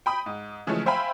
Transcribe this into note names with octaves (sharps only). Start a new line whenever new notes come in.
G5 B5 D#6
G#2
C#3 E3 F3 G#3 A3 C#4
C5 E5 F5 G5 G#5 B5